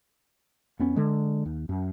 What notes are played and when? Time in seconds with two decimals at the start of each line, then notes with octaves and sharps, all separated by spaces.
0.79 F2 B3 C#4
0.96 D3 G#3
1.46 D#2
1.69 F#2